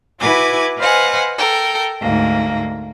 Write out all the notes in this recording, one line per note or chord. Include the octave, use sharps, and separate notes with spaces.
E4 F#4 B4 G#5 D6 G#6
B4 C5 D#5 F5 F#5 G#5
A4 A#4 G5
D2 G#2 A#3